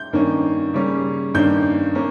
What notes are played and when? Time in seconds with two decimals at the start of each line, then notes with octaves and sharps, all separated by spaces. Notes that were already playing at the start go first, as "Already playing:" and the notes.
Already playing: G6
0.13 G2 D#3 A#3 C#4
0.73 C#3 G3 A#3 C#4
1.34 G2 D#3 A#3 C#4 G6
1.95 A#3 C#4